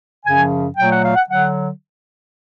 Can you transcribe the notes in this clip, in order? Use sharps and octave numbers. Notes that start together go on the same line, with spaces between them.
F#2 C#3 F3 G#5
A#2 F#3 A3 G5
F#5
F5
F#5
D3 F#3 F#5